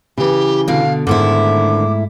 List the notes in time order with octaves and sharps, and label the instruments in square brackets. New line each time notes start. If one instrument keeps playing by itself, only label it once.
[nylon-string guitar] C#3 E3 [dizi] G4
[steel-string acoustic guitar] B2 D3 [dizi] F5
[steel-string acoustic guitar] G#2 A3 E4 [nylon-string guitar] D3 D#3 C5 [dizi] D6